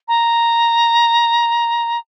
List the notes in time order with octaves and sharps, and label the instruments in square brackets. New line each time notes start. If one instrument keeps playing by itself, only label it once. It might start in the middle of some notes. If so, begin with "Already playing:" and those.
[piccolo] A#5